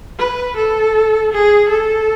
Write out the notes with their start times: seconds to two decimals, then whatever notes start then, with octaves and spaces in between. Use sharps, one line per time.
0.18 B4
0.57 A4
1.32 G#4
1.69 A4